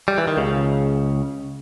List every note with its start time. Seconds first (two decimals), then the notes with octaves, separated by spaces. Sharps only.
0.08 G3
0.18 E3
0.28 D#3
0.37 C#2 C#3